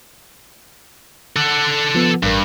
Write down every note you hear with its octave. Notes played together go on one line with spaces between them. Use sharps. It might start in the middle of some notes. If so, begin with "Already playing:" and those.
A4 F#5
F3 B3
A1 G2 A#4